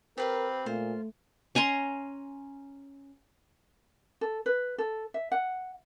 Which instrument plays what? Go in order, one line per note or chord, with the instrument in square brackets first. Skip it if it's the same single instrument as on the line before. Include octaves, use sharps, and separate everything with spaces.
[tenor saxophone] C4 [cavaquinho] G4 B4 F5 [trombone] A#4
[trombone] A#2 [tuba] A3 [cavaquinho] F4 C5
[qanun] C#4 G#5 A#5 C6
[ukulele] A4
B4
A4
E5
F#5